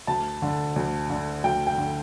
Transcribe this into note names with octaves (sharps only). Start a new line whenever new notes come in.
D2 A5
D3
D2
D3
D2 G5
G5
D3